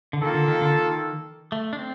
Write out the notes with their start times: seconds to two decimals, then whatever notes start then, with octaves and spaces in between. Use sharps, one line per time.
0.13 D3
0.21 D#3 A#3 F4 A4
0.34 D3
0.48 D#3
0.61 D3
0.75 D#3
1.52 A3
1.73 D4
1.79 C4